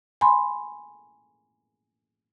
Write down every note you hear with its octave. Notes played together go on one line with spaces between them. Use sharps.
G#5 B5 C6